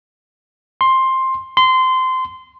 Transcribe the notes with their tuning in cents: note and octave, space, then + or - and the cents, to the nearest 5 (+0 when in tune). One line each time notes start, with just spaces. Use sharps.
C6 +10
C6 -20